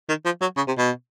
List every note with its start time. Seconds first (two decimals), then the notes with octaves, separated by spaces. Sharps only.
0.08 D#3
0.25 F3
0.41 F#3
0.57 C#3
0.68 C3
0.78 B2